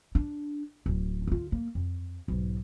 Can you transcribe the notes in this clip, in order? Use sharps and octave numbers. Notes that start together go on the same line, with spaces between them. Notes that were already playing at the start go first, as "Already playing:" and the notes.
D4
D1
D3 F4
A#3
F2
B1 G#2